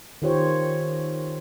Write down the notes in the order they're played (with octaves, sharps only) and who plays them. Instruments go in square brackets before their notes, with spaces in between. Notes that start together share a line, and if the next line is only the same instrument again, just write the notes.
[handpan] D#3 F4 G4 C5 C#5